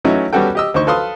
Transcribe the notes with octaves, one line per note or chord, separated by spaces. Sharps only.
E3 F#3 A3 C#4 D#4 E4
G3 B3 C#4 F#4 A4 G5
G4 D#5 E6
D2 D#4 C5 C#6
A4 B4 F5 C6 D#6